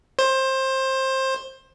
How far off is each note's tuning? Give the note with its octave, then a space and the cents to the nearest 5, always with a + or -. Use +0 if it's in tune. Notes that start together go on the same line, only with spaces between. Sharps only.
C5 +20